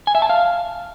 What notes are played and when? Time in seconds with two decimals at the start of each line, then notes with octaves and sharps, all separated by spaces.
0.07 G#5
0.15 E5
0.22 A5
0.29 F5